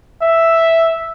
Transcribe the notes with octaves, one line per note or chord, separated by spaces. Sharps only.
E5